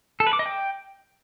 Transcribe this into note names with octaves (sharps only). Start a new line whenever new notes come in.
A4
B4
D6
D#5
G5